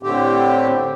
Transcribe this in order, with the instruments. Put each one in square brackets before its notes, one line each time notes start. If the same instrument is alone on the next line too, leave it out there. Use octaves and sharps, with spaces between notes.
[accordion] A2 D3 C4 G4